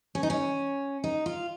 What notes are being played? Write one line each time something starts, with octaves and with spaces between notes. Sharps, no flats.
C#4
D#4
C#4
D#4
F4